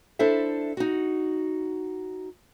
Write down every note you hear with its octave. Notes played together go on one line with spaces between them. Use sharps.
D4 E4 A4 C5 E5
D#4 F#4